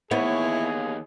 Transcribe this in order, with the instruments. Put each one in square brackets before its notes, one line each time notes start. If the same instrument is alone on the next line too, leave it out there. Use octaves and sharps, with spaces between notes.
[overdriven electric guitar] D#2 C#5 [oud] B3 [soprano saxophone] E4 [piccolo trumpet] G#4